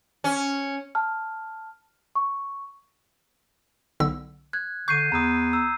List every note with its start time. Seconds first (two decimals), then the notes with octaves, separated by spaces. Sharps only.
0.24 C#4
0.95 A5 F6
2.15 C#6
4.00 B1 D3 E6
4.53 F#6 G#6
4.88 D3 C#6 G6 C7 D#7
5.12 E2 A#5 D#6
5.53 A#5 E6